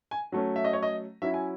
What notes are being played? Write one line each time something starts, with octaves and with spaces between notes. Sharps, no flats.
G#5
F#3 A3 C#4
E5
D#5
C#5
D#5
F#3 C#4 E4 E5
G#5